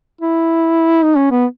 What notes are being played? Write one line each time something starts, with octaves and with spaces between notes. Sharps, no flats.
E4
D#4
C#4
B3